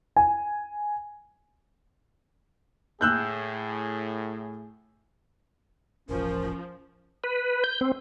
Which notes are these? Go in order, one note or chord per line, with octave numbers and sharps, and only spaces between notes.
G#5
A2 G#4 E6 F#6 G6
E1 A1 F3 C#4 A#4
B4
G6
C4